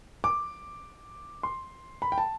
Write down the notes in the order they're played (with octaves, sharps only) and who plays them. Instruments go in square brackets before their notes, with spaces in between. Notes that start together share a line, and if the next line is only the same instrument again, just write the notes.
[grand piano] D6
C6
B5
G5
A5